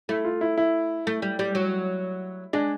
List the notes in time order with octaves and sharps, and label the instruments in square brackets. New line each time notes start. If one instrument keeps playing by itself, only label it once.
[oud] A3 [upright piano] E4
[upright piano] F4
E4
E4
[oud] A3
G3
G3
F#3
[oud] G#3 [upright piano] D4